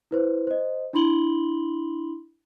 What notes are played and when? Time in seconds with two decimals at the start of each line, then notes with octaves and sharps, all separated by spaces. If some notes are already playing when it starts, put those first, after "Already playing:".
0.11 E4 B4 C5
0.47 C5 D#5
0.93 D4 E4 B5 C6 F#7 G7